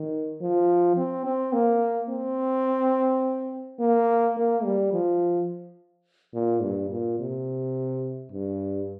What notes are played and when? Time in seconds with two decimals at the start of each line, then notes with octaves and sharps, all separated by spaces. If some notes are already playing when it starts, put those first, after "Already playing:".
Already playing: D#3
0.41 F3
0.97 C4
1.25 C4
1.53 A#3
2.09 C4
3.79 A#3
4.37 A#3
4.64 G3
4.92 F3
6.34 A#2
6.62 G2
6.90 A#2
7.19 C3
8.32 G2